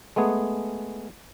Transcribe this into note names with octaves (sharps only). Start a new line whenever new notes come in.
G#3 A3 B3 G#4